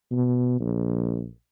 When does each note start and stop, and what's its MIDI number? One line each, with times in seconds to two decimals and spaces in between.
0.11 0.55 47
0.60 1.28 34